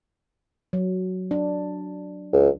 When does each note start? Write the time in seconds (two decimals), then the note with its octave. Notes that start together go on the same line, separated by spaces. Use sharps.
0.73 F#3
1.31 D4
2.33 C#2